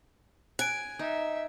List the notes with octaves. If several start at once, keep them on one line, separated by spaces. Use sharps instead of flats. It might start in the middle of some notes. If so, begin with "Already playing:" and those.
G#5 F#6 D7
D#4 E5